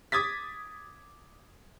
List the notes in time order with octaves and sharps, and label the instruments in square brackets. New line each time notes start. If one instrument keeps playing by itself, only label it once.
[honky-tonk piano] D6 D#6 G#6 A6 B6